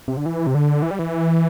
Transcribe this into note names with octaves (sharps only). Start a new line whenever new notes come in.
C3
D3
E3
C3
D3
E3
G3
E3